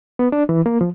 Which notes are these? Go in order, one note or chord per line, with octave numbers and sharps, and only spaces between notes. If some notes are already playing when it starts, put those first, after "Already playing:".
B3
D4
E3
A#3
F3